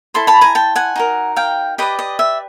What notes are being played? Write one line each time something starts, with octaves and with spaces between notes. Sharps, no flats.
E4 A4 C5 C6
A5 B5
G#5 A#5
G5 A5
F#5 G#5
D#4 F#4 A#4
F5 G5
G4 B4 D5 D#5
D#5
E5